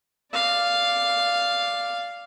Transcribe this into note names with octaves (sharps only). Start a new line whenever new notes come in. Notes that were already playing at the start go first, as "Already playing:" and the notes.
D5 F5